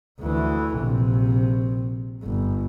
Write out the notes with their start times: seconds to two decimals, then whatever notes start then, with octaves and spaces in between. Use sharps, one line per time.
0.20 D2 E3
0.77 A#1 C3
2.23 G1